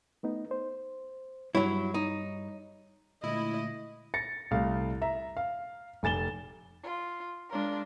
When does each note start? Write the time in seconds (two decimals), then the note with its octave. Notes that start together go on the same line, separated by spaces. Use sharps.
0.23 A3 B3 D#4
0.51 C5
1.55 G2 F#3 G3 E4 C#5
1.94 D#4
3.24 A#2 D3 G#3 A3 E4 D#5
4.14 A6 A#6 C#7
4.51 C2 A3 F5
5.02 E5 A#5
5.37 F5
6.03 F1 G#5 A6 E7 G7
6.83 F4
7.49 G#3 D4 F4 A#4